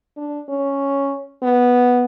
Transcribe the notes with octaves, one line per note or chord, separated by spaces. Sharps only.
D4
C#4
B3